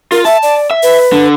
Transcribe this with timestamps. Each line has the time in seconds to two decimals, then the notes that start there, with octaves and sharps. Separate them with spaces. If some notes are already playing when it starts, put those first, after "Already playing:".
0.12 F4 A#4
0.25 E5 A5
0.43 D5
0.71 E5
0.83 B4
1.12 D3